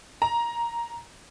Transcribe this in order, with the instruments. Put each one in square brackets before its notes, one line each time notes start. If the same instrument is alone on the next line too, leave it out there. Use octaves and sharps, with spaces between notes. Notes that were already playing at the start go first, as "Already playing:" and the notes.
[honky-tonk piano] A#5